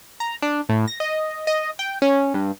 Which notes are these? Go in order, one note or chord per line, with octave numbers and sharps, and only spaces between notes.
A#5
D4
A2
A#6
D#5
D#5
G5
C#4
G2